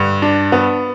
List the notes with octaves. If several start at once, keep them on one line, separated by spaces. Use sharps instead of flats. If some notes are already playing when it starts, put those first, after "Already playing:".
Already playing: G2 D3
D4
B3